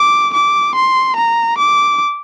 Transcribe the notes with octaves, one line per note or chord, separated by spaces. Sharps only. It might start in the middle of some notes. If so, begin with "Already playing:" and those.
Already playing: D6
D6
C6
A#5
D6